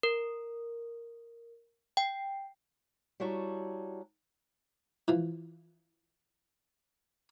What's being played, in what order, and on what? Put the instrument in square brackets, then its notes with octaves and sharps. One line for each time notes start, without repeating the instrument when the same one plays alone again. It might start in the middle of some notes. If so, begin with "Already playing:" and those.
[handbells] A#4
G5
[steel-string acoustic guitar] G3 E4 F#4 C#5 A5 A#5
[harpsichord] E3 F3